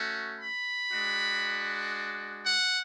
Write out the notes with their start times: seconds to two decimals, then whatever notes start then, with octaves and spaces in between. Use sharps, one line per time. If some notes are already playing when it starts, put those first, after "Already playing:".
Already playing: A3 C#4 F#4
0.39 B5
0.91 G#3 D4 F#4
2.44 F#5